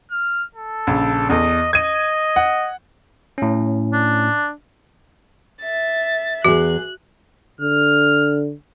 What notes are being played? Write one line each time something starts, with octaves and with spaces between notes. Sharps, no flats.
F6
A4
A#1 C#3
E2 A4 D#5
D#5 G#6 D#7
F#5
A2 C#4
D4
E5 A6
E2 F#4 G#4 F#6
D3 F6